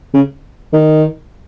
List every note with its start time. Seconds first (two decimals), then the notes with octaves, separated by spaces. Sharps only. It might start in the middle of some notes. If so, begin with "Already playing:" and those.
0.14 C#3
0.73 D#3